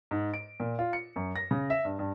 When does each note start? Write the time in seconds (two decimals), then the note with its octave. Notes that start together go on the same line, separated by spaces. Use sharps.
0.11 G#2
0.34 D7
0.60 A#2
0.79 F4
0.93 C#7
1.16 F#2
1.36 A#6
1.51 C#3
1.70 E5
1.85 G2
1.99 G2